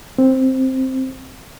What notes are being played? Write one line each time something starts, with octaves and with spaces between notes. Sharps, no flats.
C4